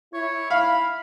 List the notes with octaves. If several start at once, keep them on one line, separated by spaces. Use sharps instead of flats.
E4 C#5
F5 B5